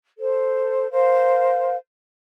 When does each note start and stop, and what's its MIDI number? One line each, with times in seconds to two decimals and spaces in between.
0.18 0.89 69
0.18 0.89 72
0.91 1.74 70
0.91 1.74 72
0.91 1.74 77